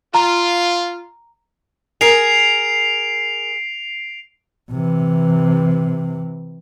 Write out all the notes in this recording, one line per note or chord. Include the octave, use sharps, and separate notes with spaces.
F4 A#5
G#4 A#4 C7 D7 F7
C3 E3